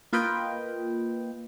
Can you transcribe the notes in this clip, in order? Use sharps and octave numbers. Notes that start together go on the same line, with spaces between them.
A#3 F4 B4 D#5 G5